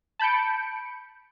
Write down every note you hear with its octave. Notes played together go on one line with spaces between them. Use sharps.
A5 B5 G6 C#7 D7